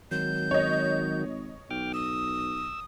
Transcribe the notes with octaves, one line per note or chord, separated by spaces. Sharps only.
G#1 D#3 F#3 G6
C#5 D#5
B1 G5 D6 F6
D#6 E6